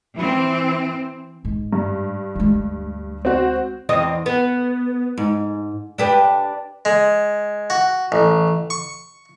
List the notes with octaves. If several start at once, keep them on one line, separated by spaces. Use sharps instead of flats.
E3 C4
G#2
G2
D2 G#3
C4 F#4
E2 C4 D#5
B3
G#2
D4 G4 B4
G#3
F#4
A1
C#6